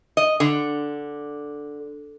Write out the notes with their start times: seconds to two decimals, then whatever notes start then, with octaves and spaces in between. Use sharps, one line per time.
0.17 D#5
0.40 D3